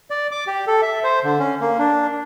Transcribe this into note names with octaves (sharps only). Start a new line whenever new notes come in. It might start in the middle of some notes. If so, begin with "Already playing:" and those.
D5
D6
G4
A4
E5
C5
D3
C#4
A#3
D4